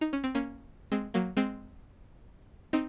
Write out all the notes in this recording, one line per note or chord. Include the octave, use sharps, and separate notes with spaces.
D#4
C#4
C4
A#3 C#4
G#3 C4
F#3 A#3
G#3 C4
C4 D#4